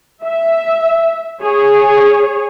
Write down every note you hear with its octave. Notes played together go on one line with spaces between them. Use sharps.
E5
G#4 C#5